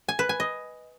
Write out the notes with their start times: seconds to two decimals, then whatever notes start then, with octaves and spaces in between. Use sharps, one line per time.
0.09 G#5
0.19 B4
0.29 G#5
0.40 D#5